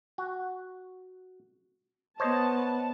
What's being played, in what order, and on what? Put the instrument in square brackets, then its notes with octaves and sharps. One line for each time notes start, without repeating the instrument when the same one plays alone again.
[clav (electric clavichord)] F#4
[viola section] B3 A5 [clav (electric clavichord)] C5 C#5 D#5